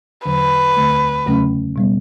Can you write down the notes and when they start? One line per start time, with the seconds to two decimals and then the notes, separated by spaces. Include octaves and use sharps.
0.25 E2 D3 F#3 B4
0.76 D2 D3 A3
1.27 E2 C#3 F#3 A3 C#4
1.76 B2 G3 B3